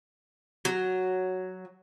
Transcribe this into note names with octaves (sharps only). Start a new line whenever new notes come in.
F#3